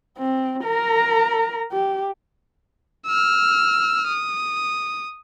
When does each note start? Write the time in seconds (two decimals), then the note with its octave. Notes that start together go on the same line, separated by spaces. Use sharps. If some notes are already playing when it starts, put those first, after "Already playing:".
0.18 C4
0.64 A#4 A#5
1.72 G4
3.07 E6 F6
4.07 D#6